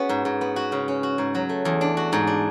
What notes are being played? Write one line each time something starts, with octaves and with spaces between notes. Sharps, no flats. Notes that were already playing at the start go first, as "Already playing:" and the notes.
Already playing: B3 C#4 F#4 G#4
G#2
G#2
B3
F#4
C#3
C#4
F#4
G#2
F#3
A3
E2
D4
F#4
G#2
D4